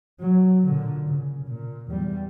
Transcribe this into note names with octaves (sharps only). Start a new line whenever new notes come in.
F#3
A#2 D3
C#3
A#2
E2 G3